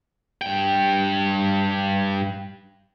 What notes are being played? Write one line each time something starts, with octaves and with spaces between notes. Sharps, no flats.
G2 G5